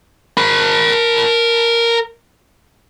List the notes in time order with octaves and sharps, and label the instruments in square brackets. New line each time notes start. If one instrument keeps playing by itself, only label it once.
[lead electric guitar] A#4 B5